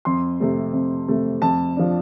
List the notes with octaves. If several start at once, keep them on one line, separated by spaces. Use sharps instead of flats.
F2 C6
C3 A3
F2
C3 A3
F2 A5
F3 D4